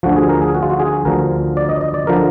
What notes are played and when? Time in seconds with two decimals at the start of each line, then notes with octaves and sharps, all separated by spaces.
0.03 D2 D3 F3 F#4
0.16 G#4
0.29 A#4
0.42 G#4
0.55 F#4
0.63 F4
0.70 F#4
0.80 G#4
1.05 D2 D3 F3 A#4
1.57 D5
1.69 D#5
1.81 D#5
1.94 D5
2.07 D3 F3 A#4